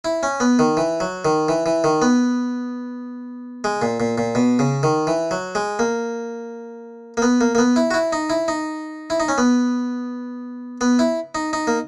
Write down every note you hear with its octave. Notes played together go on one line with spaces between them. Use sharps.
E4
C#4
B3
D#3
E3
F#3
D#3
E3
E3
D#3
B3
G#3
A#2
A#2
A#2
B2
C#3
D#3
E3
F#3
G#3
A#3
A#3
B3
A#3
A#3
B3
E4
F#4
E4
D#4
E4
D#4
E4
D#4
C#4
B3
B3
E4
D#4
D#4
A#3